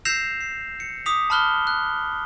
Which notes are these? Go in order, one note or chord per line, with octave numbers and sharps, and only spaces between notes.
E6 G6 A#6 C7 E7 F7
C7
C#7
D6 D#6 B6 F7
A5 B5 F6 F#6 G7
F#6